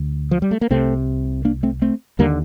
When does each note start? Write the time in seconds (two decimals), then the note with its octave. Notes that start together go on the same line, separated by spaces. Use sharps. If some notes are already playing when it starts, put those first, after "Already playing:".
Already playing: D2 D3
0.31 F3
0.42 G3
0.51 A3
0.61 A#3
0.70 C2 C3 A3 C4
1.45 A#3 D4
1.63 A3 C4
1.82 A3 C4
2.19 D#2 D3 G3 A#3